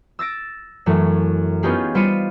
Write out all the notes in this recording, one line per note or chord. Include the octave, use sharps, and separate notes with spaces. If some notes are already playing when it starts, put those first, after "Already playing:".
E6 A6 A#6 D7
F#2 E3 A3
B3 C#4 D#4 F4 G4 G#4
G3 F4 C5 B5 C#7 D#7